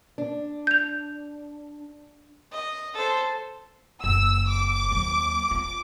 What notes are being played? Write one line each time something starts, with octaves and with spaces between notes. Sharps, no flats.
D4
G6 F7
D#5
A4 C5
F#1 E6
D6
D#2 F#3
F4